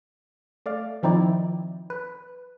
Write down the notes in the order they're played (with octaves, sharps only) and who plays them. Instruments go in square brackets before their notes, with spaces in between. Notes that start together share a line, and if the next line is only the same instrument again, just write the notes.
[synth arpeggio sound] A3 D5 F5
D#3 F3 C4 D#4 E4 D5
B4